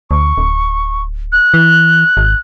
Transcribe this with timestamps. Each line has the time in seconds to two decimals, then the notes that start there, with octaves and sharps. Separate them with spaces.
0.11 D2 C#6
0.38 D1
1.32 F#6
1.54 E3
2.17 G#1